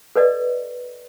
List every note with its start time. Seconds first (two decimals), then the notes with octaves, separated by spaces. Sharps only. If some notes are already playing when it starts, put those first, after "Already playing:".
0.16 A4 B4 D5 D#5